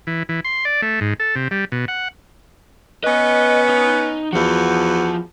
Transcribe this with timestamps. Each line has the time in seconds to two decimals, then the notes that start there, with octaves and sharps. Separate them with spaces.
0.07 E3
0.29 E3
0.45 C6
0.65 D5
0.82 A3
1.01 G#2
1.20 A4
1.36 C3
1.51 G3
1.72 B2
1.88 F#5
3.04 B3 C#4 B4 D#5
3.69 D#4
4.33 E2 E3 F3 F4 F#4